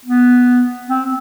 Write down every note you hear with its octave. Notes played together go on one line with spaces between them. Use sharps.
B3
C4